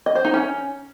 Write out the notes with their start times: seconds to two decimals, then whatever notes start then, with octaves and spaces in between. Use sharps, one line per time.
0.06 D#5
0.15 C5
0.25 D#4
0.34 C#4